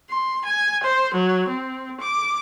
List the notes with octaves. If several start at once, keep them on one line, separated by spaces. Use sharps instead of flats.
C6
G#5
C5
F#3
C4
D6